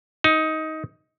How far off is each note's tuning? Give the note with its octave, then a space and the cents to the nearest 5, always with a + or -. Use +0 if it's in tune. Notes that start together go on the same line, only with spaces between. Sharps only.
D#4 +15